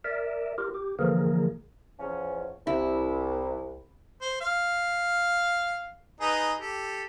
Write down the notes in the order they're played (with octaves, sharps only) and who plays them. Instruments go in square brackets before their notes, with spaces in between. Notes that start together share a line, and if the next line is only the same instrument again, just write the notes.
[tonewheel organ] A#4 D5 E5
F4 G4 A#4
G4
D3 E3 F3 A#3 G#4 A#4
[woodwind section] E2 F3 C#4
[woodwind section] C2 [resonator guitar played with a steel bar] E4
[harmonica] C5
F5
D#4 G#4 B4
G4 A4